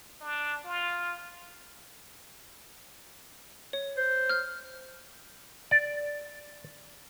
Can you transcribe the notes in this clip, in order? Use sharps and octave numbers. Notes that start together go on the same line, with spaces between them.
D4
F4
C#5
C5
F6 G6
D5